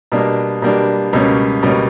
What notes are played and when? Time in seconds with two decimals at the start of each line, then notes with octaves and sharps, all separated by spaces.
0.12 B2 G3 A#3 D4
0.62 B2 G3 A#3 D4
1.13 C#2 B2 G3 A#3 C#4
1.63 C#2 B2 G3 A#3 C#4